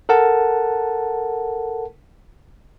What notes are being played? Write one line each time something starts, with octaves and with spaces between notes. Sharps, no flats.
A4 A#4 F#5 A5